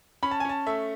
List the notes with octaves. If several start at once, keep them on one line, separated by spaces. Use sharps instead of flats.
C#4 B5
A5
G#5
C#4 A5
A3 E5